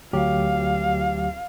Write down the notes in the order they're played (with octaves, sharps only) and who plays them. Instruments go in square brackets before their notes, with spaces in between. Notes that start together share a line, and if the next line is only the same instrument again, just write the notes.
[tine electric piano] D2 F#3 G4 [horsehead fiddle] F5